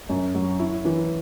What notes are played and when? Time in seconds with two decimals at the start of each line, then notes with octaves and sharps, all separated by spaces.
0.09 F#2
0.34 F#3
0.59 E4
0.85 E3